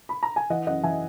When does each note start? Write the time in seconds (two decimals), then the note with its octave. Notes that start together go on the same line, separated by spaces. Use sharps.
0.09 B5
0.23 A#5
0.36 G#5
0.50 E3 D#5 F#5
0.67 F#2 D#5 F#5
0.84 E3 E5 G#5